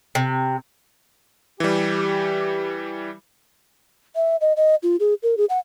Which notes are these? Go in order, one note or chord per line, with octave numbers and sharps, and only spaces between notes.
C3
E3 G3 G4
E5
D#5
D#5
F4
G#4
A#4
G#4
F#5